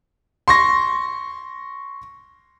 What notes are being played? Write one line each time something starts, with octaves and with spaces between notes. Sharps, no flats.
C6 C#6 A#6